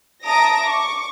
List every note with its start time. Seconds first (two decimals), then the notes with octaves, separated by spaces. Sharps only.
0.24 E5 A5 A#5 D#6 A#6 D7
0.61 C#6 D6